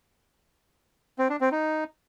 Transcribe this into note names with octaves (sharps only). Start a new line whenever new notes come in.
C4
D4
C4
D#4